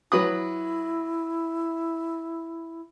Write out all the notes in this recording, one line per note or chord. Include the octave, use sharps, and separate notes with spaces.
F#3 E4 B4 D#6